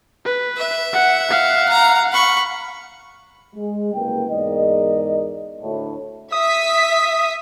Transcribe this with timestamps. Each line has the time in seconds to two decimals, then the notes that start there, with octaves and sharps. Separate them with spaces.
0.25 B4
0.57 E5
0.93 F#5
1.30 F5 F#5
1.69 A#5
2.12 B5 C#6
3.55 G#3
3.94 F#1 C2 A#3 B4 G5
4.29 E2 G#2 A#4 D5 D#5
5.61 D2 A2
6.32 E5 D#6 B6